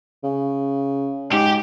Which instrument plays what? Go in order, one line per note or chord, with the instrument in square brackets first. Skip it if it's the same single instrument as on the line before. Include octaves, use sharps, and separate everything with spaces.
[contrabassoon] C#3
[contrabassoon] G#2 [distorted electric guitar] G4